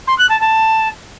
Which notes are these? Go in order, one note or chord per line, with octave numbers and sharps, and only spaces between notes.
C6
F#6
A5
A5